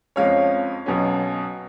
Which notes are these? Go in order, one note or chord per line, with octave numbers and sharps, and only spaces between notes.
F2 F3 G#3 C#4 C#5 F5
B1 B2 F#3 C#4